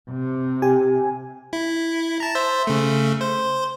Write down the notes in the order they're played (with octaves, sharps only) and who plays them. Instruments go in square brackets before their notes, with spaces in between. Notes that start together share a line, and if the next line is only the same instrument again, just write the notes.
[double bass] C3
[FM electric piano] G4 G#5
[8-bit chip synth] E4
A5 A#5
C5 E5
C#3 A3
C5